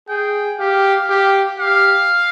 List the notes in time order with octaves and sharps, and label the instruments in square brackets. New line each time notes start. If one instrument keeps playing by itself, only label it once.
[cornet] G#4 [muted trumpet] G5
[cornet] G4 [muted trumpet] F5
[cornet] G4
[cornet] G4 [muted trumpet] F5